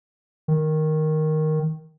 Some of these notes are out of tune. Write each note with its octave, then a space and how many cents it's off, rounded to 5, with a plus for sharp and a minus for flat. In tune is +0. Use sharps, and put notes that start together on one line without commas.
D#3 +0